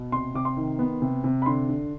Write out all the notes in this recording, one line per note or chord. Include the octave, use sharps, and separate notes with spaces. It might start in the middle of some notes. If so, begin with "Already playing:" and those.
Already playing: B2
C3 C6
C3 D6
C6
D#3
B3
C3
C3
B5
D3 C6
D3